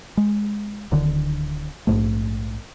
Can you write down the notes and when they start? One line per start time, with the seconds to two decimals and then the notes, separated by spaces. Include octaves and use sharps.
0.17 G#3
0.92 D1 D3 D#3
1.87 A#1 E2 G#2 A3